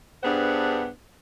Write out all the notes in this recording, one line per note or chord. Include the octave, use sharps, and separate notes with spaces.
G2 B3 D4 G#4 C5 F#5